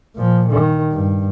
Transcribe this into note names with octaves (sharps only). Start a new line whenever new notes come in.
A#2 F3
D#3
G2